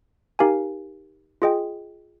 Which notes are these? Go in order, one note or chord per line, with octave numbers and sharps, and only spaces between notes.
D#4 G4 A#4 F5 G#5
F4 G#4 D#5 G5